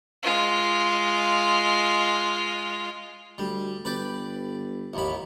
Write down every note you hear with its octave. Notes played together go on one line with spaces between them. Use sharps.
G#3 F4
D2 G3
G1 B4 D5 G5
A1 D#2 B5